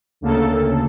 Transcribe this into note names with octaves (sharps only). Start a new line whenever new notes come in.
D2 C#3 A#3 A4